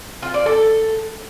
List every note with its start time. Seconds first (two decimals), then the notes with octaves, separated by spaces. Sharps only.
0.22 F4
0.34 D5
0.46 A4